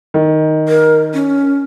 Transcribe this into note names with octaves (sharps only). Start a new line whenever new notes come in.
D#3
A#4
C#4